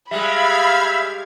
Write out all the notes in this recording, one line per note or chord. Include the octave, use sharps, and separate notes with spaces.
G3 G#3 E5 F5 B5 G#6